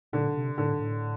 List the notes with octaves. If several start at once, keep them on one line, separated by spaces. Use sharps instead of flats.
A#2 D3
C3
A2 D3
A2